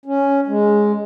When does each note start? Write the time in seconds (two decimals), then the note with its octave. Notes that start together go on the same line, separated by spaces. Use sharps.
0.05 C#4
0.47 G#3